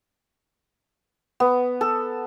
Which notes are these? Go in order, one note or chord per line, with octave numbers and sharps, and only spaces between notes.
B3
A4